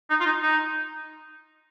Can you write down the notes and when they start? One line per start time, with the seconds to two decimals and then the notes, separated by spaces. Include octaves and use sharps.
0.10 D#4
0.20 F4
0.26 D#4
0.42 D#4